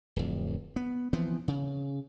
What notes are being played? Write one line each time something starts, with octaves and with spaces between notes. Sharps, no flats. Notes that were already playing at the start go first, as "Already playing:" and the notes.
D1 F2
B3
E3 F3 B3 C4
C#3